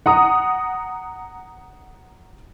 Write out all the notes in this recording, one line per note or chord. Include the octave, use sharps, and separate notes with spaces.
F#5 A#5 D#6